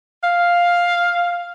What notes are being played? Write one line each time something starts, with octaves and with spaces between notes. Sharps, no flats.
F5